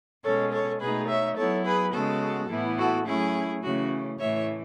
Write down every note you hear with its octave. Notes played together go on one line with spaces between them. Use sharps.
B2 G#3 C#4 A4 C#5
A4 C#5
B2 A3 D#4 G#4 B4
C#5 E5
F#3 B3 E4 A4 C#5
G#4 B4
C#3 G#3 B3 F#4 A4
A2 E3 B3 E4
F#4 A4
F#3 A3 C#4 E4 G#4
C#3 E3 A3 C#4 F#4
A2 E3 A3 C#5 E5